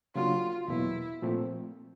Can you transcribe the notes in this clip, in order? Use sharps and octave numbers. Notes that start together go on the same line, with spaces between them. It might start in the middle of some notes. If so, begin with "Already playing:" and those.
C#3 F#3 A#3 D4 F4 F#4
E2 B2 F#3 A#3 E4
A#2 F3 A3 C4